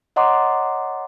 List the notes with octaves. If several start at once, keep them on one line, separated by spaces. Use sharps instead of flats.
C#5 D#5 F#5 A#5 C6 D6